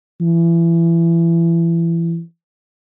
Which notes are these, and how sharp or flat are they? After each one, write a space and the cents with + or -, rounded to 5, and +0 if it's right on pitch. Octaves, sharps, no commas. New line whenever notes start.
E3 +25